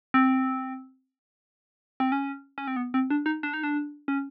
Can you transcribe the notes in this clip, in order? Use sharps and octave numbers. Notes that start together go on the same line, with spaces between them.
C4
C4
C#4
C#4
C4
B3
C4
D4
D#4
D4
D#4
D4
C#4